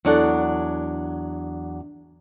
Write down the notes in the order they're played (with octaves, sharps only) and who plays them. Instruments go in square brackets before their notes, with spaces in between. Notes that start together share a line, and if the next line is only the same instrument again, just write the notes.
[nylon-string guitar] E2 F#3 D4 A4 F#5